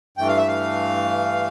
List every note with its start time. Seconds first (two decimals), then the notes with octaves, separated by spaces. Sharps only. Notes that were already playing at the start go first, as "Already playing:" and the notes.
0.17 G2 E3 A3 G5
0.28 F5
0.38 E5
0.48 F5